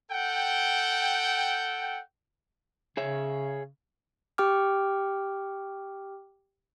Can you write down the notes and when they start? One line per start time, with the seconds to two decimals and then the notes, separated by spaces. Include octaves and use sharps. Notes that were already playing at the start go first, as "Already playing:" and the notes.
0.11 A4 F#5 G5
2.97 C#3 G#4 C#5 E5
4.38 G4 G5 D6 F6